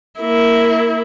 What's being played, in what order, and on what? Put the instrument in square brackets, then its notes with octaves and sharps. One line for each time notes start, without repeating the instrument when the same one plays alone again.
[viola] A#3 E4